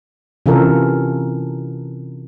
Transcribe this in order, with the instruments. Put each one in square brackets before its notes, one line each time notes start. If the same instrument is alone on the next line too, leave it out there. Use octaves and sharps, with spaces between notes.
[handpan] C3 E3 C#4 F4 A4 A#4